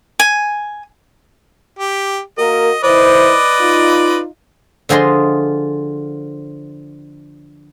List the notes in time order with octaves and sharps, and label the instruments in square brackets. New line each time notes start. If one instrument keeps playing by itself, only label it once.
[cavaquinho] G#5
[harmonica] G4
[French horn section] A#3 F#4 A#4 [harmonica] D#5
[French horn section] D#3 E4 C5 [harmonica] B4 D5 D#5
[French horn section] D#4 F4
[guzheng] D3 F3 G#4 D#5 C6